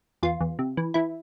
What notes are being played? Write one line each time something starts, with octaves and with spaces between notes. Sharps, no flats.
E2 F4
E2
C3
E3
E3 E4